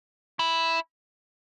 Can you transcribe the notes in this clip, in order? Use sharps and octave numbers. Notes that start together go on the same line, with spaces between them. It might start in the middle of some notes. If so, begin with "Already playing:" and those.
E4